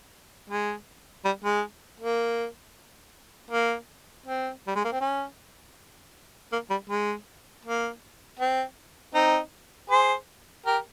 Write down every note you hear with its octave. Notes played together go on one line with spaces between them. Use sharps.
G#3
G3
G#3
A#3
A#3
C4
G3
G#3
A#3
C4
C#4
A#3
G3
G#3
A#3
C4
C4 D#4
G#4 C5
G4 A#4